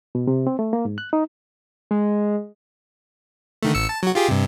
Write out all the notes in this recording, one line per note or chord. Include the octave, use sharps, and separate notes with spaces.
B2
C3
C4
A3
A#3
G#2
F#6
D#4
G#3
D3 D#3 A3
A1 E6 C#7
A5
F#3 F#4
F4 G4 G#4
G2 C3